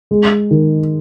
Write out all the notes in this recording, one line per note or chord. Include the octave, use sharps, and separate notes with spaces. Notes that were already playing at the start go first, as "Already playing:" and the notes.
G#3
D#3